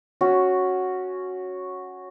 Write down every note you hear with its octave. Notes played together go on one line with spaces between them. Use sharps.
C#4 F#4